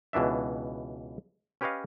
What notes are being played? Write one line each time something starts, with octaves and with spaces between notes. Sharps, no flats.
C#2 B2 E3 D4 E5
C#4 G4 B4 C#5 D#5 F5